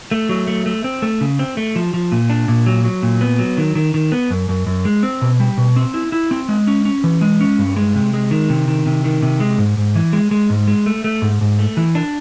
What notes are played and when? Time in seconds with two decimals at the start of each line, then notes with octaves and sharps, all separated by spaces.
0.11 A3
0.29 F#3
0.47 A3
0.66 A3
0.84 C4
1.02 A3
1.21 C#3
1.39 C4
1.57 A3
1.76 F3
1.94 F3
2.12 A#2
2.30 D4
2.48 A#2
2.66 F#3
2.84 F#3
3.03 A#2
3.21 B3
3.39 F#3
3.58 D#3
3.75 D#3
3.94 D#3
4.12 B3
4.31 F#2
4.49 F#2
4.66 F#2
4.85 G#3
5.03 C4
5.22 B2
5.40 G3
5.57 B2
5.76 C4
5.94 E4
6.12 E4
6.31 C4
6.49 G#3
6.67 C#4
6.85 C#4
7.04 E3
7.21 G#3
7.41 C#4
7.58 G2
7.76 G#3
7.95 C3
8.13 G#3
8.31 D#3
8.49 C3
8.68 D#3
8.86 C3
9.04 D#3
9.22 C3
9.40 G#3
9.58 G#2
9.77 G#2
9.95 E3
10.13 G#3
10.31 G#3
10.50 G#2
10.68 G#3
10.86 A3
11.04 A3
11.22 G#2
11.41 G#2
11.59 A3
11.77 E3
11.95 D4